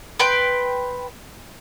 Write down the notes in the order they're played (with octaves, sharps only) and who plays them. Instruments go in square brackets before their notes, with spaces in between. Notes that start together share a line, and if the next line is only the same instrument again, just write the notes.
[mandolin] B4 G5 C6